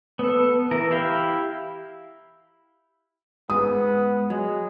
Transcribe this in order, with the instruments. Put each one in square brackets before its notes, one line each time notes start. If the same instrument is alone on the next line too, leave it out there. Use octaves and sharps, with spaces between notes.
[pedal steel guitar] B3 A4
E3 A#4
E4 G4 F5 G5
[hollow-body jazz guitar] G#2 [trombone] B3 [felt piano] D#6
[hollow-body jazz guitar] F#3 [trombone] G#3